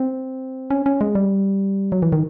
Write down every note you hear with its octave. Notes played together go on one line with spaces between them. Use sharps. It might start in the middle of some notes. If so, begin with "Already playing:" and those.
Already playing: C4
C#4
C#4
G#3
G3
F#3
E3
D#3